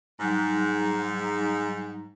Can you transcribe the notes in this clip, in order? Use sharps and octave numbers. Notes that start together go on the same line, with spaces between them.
G#2 F#3 G3 D#4